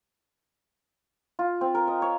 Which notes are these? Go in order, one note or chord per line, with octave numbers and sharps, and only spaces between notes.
F4
C4
A#4
D#5
C#5